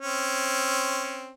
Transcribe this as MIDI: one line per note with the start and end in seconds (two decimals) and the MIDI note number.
0.01 1.32 60
0.01 1.32 61